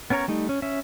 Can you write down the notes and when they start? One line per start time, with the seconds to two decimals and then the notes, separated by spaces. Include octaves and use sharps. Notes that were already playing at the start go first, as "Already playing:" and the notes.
0.10 B3 C#4 A#4 C#5 A#5
0.28 G3 A3 D#4
0.49 C#4
0.62 C#4 E5